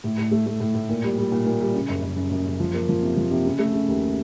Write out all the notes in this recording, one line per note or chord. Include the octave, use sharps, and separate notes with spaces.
A2
A2
A3
A3
A2
A2
A#2
G3
G3
A#2
A#2
G3
C#3
F#1
F#1
F#2
F#2
F#1
F3
A#3
F3
C3
F3
C3
C#3
A3
C#3
D#2